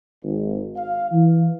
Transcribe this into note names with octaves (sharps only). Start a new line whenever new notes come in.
G#1
F5
E3